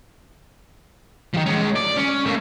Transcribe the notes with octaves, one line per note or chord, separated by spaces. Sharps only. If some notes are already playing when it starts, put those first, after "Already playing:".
D#3 F3
G#3 C#4
D5
C#4
A3 A#3